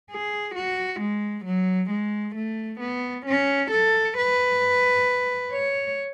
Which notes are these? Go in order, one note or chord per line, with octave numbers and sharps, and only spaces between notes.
G#4
F#4
G#3
F#3
G#3
A3
B3
C#4
A4
B4
C#5